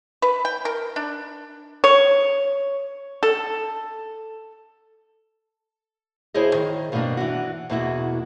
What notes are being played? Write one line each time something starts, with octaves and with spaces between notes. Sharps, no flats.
B4
G5
A#4
D4
C#5
A4
D2 E4 G#4 C5 C#5 D#5
D#3
G2 B2 D#3 A3 A#3 D4
E3 D4 F#4
E2 B2 A#3 E4 F#4